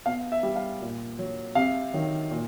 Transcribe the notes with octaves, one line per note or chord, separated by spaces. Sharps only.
B2 F5
E5
G3
F5
A#2
F#3
C3 F5
D#3 F#3
A#2